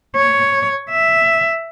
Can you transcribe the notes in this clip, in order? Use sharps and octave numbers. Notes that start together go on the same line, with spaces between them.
C#5
E5